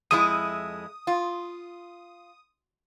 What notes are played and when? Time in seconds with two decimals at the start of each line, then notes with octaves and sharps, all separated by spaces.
0.11 F2 G#3 E4 D#6
1.07 F4